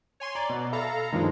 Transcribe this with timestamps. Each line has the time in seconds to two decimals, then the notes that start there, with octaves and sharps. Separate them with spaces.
0.20 C#5 G#5 C6
0.35 D5 A#5
0.49 B2
0.72 A4 E5 F5 A#5 B5
1.12 G2 A#2 D#3 F3 G#3